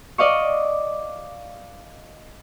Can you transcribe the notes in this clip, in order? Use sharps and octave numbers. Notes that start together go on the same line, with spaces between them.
D5 D#5 F5 C#6